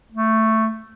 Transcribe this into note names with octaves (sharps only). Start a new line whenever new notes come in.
A3